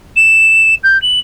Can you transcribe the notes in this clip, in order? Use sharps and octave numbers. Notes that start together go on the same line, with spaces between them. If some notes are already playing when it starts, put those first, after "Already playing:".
E7
G6
F#7